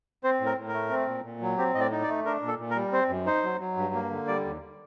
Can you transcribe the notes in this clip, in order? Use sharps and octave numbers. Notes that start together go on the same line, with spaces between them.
C4 C5
A2
A#4
A2
A#4
A3
C4
A#2
A#2
F#3
C4 G4
A2 D#5
D5
D#4
D5
A3
D4 A#4
A#2
A4
A#2
A#4
G3
C4 C5
F#2
D#4 C5
F#3
F#3
G2
A#3
D3
G3 D5
D#2